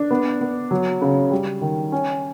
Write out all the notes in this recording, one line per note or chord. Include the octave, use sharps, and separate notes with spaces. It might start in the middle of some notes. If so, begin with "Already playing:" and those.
Already playing: D4
B3
B3
F#3
C#3
G3
D#3
C#4